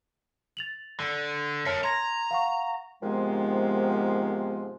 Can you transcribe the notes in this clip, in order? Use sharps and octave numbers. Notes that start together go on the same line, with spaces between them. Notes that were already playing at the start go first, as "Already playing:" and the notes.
A6 F7 F#7
D3
A#4 C#5 E5 A5 C#7
A#5 C6 G#6 A#6
F5 F#5 C#6
G#2 C3 D#3 F3 G#3 B3